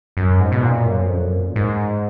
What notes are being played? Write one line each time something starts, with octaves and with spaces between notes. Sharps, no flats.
F#2
G#2
B2
A#2
F#2
F2
F#2
A#2
G#2